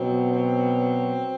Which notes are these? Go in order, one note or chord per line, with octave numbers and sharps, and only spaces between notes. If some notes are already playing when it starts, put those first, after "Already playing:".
Already playing: B2 F#3 C4
C4